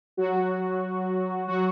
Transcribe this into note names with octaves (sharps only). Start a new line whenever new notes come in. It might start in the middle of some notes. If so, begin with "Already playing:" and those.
F#3 F#4
F#3 F#4